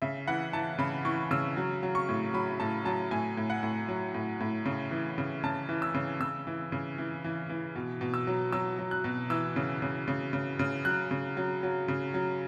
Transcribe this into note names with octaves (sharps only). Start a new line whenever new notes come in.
C#3 E5
E3 F#5
E3 A5
C#3 B5
E3 C#6
C#3 E6
F#3
F#3
C#6
A2
F#3 B5
A2 A5
F#3 A5
A2 G#5
A2
F#5
A2
F#3
A2
A2
C#3
E3
C#3
C#3 A5
E3
E6
C#3
C#3 E6
E3
C#3
E3
E3
E3
B2
B2
E6
F#3
F#3 E6
F#3
F#6
B2
E3 E6
C#3
C#3
C#3
C#3
C#3
F#3 F#6
C#3
F#3
F#3
C#3
F#3